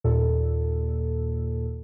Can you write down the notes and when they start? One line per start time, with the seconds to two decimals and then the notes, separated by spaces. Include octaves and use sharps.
0.04 D#2 A#2 A4